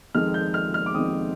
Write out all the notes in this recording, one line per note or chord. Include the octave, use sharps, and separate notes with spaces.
F2 D#3 G#3 C4 F6
G6
F6
F6
D6
F2 D#3 G#3 C4 D#6